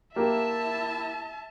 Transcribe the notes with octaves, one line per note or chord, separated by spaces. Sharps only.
A#3 E4 G4 E5 A5